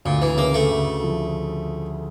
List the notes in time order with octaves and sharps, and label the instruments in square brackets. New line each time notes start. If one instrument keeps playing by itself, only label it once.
[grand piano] D2 [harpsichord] A#2
[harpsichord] E3
[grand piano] C#3 [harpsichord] A#3
[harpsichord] A3
[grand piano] D2
F3